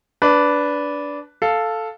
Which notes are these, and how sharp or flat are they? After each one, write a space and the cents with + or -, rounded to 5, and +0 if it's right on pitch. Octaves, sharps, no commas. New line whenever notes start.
D4 -15 B4 +0 A5 +25
A4 +0 F5 +0